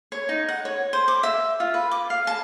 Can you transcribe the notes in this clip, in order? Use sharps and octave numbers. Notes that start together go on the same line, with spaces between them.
C#5
D#4
F#5
C#5
C5
D6
E5
F4
B4
D6
F5
A5